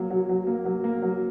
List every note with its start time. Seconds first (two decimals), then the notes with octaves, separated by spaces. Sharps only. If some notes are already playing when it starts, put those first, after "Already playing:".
Already playing: F#3 A#3
0.10 F#3
0.29 F#3
0.47 A#3
0.65 F#3
0.84 A#3
1.02 F#3